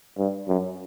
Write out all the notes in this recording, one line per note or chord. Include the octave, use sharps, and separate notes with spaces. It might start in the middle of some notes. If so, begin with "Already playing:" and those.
G2
F#2